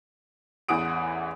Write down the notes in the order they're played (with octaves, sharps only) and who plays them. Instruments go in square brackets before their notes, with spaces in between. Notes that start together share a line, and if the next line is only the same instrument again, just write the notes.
[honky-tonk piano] A1 E2 E3 F#5 D#6 D7